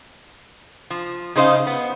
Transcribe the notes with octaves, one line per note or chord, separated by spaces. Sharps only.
F3
C#3 D#4 C5 D#5 F5
B3